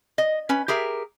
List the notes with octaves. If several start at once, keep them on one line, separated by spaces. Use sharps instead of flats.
D#5
C#4 B4
G4 G#4 A#4 E5